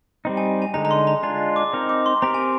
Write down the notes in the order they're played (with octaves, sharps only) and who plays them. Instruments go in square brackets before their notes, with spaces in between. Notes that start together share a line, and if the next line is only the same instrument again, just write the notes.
[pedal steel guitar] G3 C4 D#4
[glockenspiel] G#5
G#5
[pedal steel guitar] D3 G#3 D#4 [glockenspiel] A#5
[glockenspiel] A#5
C6
A#5
[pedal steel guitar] G#3 D4 F4 [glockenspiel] A#5
[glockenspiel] D6
[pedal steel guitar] C4 D#4 A#4
[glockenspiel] D6
C6
[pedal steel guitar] C4 G4 A#4 [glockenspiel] A#5
[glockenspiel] G#5